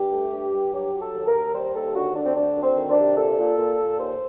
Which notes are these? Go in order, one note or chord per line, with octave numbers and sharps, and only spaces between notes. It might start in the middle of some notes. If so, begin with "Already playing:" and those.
Already playing: G2 G4
A3
G2
G2
F#3 G4
F#3
A4
D#2
A#4
D#2
G3 C5
D#2 A4
D3 F#4
D3 D4
C4
D2 D4
D2
C4
D#3
D4
C3
A#2 A4
A#2
A#2
A#2
D#2 C5